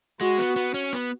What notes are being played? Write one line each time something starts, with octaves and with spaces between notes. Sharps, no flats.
G#3 F#4
B3
B3
C#4
B3